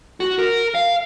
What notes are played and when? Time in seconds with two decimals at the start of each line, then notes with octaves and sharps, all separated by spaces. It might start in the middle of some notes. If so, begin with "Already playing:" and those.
0.20 F#4
0.39 A#4
0.75 F5